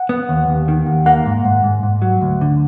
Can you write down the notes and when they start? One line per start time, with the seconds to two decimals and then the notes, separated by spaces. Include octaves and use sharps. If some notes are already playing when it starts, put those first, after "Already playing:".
Already playing: F#5
0.09 B3
0.29 D#2
0.48 D#2
0.68 D#3
0.86 D#2
1.06 A#3 F#5
1.26 G#2
1.45 G#2
1.64 G#2
1.83 G#2
2.02 F#3
2.22 D2
2.41 D3